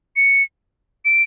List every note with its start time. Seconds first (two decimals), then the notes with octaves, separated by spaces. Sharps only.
0.16 C#7
1.05 D7